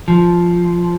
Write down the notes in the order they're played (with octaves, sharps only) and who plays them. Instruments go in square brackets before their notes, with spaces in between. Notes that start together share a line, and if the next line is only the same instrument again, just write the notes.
[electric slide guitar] F3